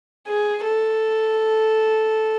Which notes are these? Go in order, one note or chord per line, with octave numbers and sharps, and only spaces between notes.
G#4
A4